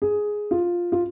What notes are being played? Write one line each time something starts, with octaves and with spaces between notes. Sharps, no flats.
G#4
F4
F4